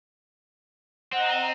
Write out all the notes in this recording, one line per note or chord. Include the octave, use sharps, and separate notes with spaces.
C4 D#5 F#5 A#5 D#6